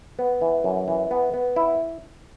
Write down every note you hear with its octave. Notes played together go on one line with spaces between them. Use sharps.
B3
E3
F#2
E3
B3
B3
E4